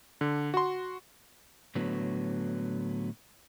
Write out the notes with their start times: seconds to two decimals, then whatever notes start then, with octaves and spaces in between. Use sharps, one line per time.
0.21 D3
0.54 F#4 C6
1.75 A2 D3 F#3 B3